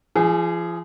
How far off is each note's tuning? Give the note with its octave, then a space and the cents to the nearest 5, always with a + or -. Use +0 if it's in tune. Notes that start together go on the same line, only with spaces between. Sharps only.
F3 -40 G#4 +0